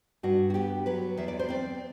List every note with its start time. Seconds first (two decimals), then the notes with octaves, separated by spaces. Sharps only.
0.23 G2 F#4
0.50 F#4
0.54 B3 G4
0.86 F#3 B4
1.17 E2 E5
1.28 D5
1.39 C5
1.49 C4 D5